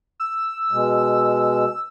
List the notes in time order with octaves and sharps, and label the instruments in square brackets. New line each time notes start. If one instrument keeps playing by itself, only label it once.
[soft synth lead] E6
[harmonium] B2 G#3